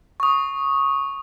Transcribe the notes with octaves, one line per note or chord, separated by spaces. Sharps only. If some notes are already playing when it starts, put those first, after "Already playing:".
C#6 D#6